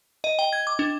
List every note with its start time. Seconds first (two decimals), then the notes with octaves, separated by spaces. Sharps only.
0.24 D#5
0.39 G5
0.53 G#6
0.67 D6
0.79 D4